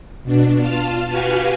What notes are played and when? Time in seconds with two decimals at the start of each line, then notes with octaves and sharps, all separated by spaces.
0.24 B2 D4
0.58 F4 A5 F6
1.09 F#4 G4 B4 F5 G#5